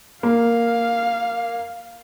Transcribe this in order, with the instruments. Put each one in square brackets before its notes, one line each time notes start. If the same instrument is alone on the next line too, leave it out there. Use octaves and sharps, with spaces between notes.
[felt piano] A#3 [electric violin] F5